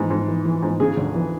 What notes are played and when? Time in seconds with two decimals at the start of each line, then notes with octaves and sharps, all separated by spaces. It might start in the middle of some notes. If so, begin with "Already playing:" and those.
Already playing: G#2 E3
0.10 G#2
0.28 E3
0.45 E3
0.62 G#2
0.80 C#3 G#4
0.97 D2
1.15 E3